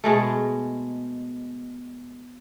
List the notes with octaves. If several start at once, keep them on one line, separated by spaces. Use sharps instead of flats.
B2 G#3 A3